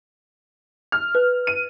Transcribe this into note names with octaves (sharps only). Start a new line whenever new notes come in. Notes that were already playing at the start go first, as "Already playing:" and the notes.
F6
B4
D#7